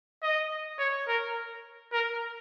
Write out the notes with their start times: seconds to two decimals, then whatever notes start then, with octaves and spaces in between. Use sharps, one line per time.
0.23 D#5
0.79 C#5
1.08 A#4
1.92 A#4